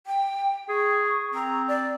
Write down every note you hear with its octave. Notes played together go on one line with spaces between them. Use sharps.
G5
G#4 C#6
C4 A#5
D5